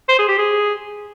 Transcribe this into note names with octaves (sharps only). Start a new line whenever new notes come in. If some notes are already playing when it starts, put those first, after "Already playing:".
C5
G#4
G4
G#4